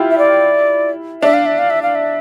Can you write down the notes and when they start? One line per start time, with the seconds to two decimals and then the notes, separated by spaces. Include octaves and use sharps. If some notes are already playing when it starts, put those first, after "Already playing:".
Already playing: E4 F4 G4
0.11 E5
0.18 D5
1.22 D4 E5
1.34 F5
1.46 E5
1.58 F5
1.70 E5
1.83 F5
1.95 E5